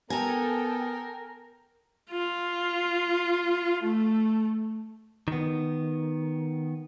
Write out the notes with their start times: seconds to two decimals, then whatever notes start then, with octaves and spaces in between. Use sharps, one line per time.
0.10 B3 A4 A#4 G5 G#5 A#5
2.11 F4
3.83 A3
5.28 D#3 B3